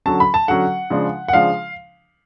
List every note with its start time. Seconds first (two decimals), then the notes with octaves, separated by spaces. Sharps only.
0.06 D3 F#3 C#4 A5
0.20 B5
0.34 A5
0.48 D3 F#3 C#4 F#5
0.90 C#3 F3 G#3 D4
1.28 F#5
1.33 C#3 F3 G#3 D4 F5